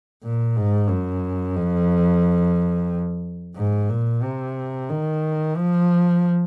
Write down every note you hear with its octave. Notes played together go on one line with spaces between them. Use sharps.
A#2
G#2
F#2
F2
G#2
A#2
C3
D#3
F3